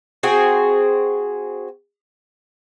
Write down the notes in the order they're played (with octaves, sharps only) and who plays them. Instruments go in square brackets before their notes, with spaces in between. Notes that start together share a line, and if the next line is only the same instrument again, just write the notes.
[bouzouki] C4 F#4 G#4